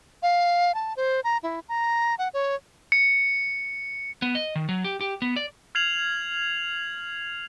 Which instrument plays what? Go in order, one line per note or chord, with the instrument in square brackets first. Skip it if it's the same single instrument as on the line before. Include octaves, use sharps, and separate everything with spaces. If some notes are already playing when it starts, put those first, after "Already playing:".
[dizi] F5
A5
C5
A#5
E4
A#5
F#5
C#5
[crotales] C#7
[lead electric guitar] B3
D#5
D#3
F#3
G4
G4
B3
D5
[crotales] F6 G#6 C7 F7 F#7